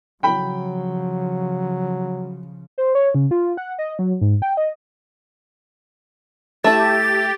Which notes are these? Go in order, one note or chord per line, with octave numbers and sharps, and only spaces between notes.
C#3 F3 F#3 G5 B5
C5
C#5
C#3
F4
F#5
D#5
F#3
G#2
G5
D#5
A3 E4 G4 E5 A5 A6